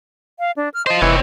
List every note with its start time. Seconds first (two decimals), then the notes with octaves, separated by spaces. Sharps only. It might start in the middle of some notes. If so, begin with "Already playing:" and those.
0.39 F5
0.57 D4
0.74 F6
0.87 F4 C5 D#5
1.02 F1 E3 C4 C#5